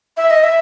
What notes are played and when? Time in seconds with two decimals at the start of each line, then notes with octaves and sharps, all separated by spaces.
0.17 E5
0.30 D#5
0.43 E5